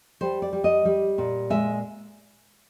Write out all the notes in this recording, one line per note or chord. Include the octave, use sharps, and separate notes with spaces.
G3 C5
D5
G3
D#5
G3
A#2
G#3 E5